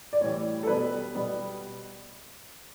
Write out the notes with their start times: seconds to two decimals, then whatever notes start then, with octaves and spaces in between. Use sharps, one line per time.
0.13 D5
0.21 A2 E3 G3 C#5
0.63 A4
0.67 B2 G3 B3 B4
1.15 B2 G3 B3